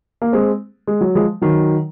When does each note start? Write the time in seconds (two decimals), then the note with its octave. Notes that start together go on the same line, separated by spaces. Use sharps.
0.22 A#3
0.33 G#3 C4
0.87 G#3
1.01 F#3
1.15 F3 G#3
1.41 D#3 F#3